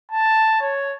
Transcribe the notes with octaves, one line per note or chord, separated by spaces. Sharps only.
A5
C#5